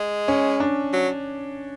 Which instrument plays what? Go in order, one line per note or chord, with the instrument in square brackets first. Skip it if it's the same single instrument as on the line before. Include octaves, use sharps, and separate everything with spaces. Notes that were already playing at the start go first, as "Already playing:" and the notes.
Already playing: [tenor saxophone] G#3
[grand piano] C#4
D4
[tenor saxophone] F#3